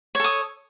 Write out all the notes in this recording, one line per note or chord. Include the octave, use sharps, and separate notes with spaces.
A4 C#5 D#6